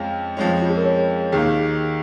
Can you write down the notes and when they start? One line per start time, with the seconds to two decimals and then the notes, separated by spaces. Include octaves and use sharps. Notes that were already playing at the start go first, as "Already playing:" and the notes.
Already playing: F2 F3 G#3 C#4 F5
0.37 F2 F3 G#3 C#4
0.62 F4
0.69 G#4
0.77 A#4
0.85 C#5
1.32 D#2 D#3 A#3 G#4